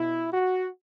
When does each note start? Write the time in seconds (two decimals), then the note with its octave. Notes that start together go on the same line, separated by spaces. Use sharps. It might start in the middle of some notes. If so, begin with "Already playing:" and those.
Already playing: B2 E4
0.31 F#4